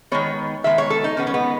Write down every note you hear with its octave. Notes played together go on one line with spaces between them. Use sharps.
D#3 G#3 B3 C#5
D#3 G#3 B3 E5
C#5
A4
D#4
D#3 G#3 B3 C#4
C#4
B3